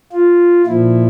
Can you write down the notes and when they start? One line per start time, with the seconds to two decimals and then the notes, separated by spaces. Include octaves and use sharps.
0.12 F4
0.67 A#2 F3 E4